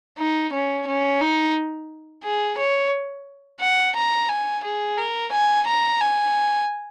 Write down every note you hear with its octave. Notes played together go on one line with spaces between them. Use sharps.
D#4
C#4
C#4
D#4
G#4
C#5
F#5
A#5
G#5
G#4
A#4
G#5
A#5
G#5